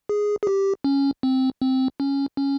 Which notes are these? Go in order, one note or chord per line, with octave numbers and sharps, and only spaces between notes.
G#4
G#4
G4
C#4
C4
C4
C#4
C#4